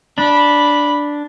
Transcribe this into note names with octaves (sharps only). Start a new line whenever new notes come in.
D4 B5